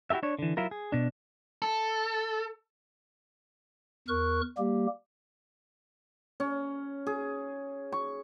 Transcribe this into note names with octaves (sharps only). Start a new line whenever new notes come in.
E4 F#4 G4 A4 E5
D4 C#5
D3 E3
F#3 E4 F4 A#4
G#4
B2 D4
A4
E2 A#4 C#6 F#6
G3 A#3 G4
C#4
G#4
C#6